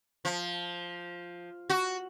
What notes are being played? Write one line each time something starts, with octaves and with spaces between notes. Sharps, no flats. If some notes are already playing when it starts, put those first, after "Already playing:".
F3
F#4